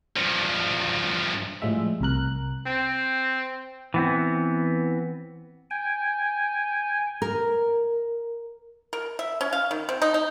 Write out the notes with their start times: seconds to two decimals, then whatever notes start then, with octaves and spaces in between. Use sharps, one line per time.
0.16 G2 F3
1.62 A2 F3 G3 G#3 E5
2.01 C2 C3 A#4 F#6
2.67 C4
3.94 E3 B3 C4
5.71 G5 G#5
7.22 A#4
8.93 A#4
9.19 E5
9.41 C#4
9.53 F5
9.71 D#3
9.89 C4
10.02 D#4
10.14 D#4